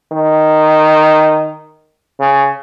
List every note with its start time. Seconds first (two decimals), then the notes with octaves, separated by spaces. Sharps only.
0.13 D#3
2.20 C#3